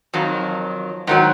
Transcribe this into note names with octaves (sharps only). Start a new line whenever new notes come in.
F2 D#3 F#3
G#2 D#3 F#3